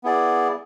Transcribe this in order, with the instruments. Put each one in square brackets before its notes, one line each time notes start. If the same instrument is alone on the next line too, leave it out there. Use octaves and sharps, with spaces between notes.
[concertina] B3 E4 G#4 D5